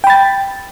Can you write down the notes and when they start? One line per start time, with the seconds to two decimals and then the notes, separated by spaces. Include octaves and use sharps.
0.04 G5
0.07 B5
0.10 A6